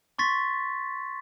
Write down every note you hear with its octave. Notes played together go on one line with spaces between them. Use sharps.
C6 C#6 A6 B6